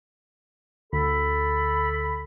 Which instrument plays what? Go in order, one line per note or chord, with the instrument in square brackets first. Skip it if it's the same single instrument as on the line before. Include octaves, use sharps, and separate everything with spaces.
[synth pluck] D2 [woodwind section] A4 B5